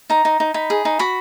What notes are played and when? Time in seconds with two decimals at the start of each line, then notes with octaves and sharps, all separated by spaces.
0.10 D#4 A#5
0.25 D#4
0.40 D#4
0.54 D#4 B5
0.70 G#4
0.85 D#4
0.99 F#4 B5